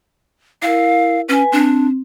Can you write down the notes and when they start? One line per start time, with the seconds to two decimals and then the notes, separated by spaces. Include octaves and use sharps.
0.62 E4 A#4 F5
1.29 C#4 B4 G#5
1.52 C4 D4